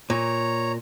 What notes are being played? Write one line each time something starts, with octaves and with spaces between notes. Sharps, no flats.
A#2 C#5 A#5